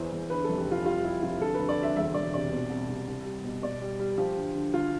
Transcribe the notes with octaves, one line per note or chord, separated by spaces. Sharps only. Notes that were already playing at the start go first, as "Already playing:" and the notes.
Already playing: E2 E3 C5
E2
D3 B4
F1 A4
G4
F1 F4
G3 F4
G3 E4
F1 F4
D2 A4
D2 B4
D5
D2
E5
E1 E5
E1 D5
C3 D5
B2
C2
C2
C2
G3
B2
B2 D5
G3
G3
F3 G4
D2
D3
D2 F4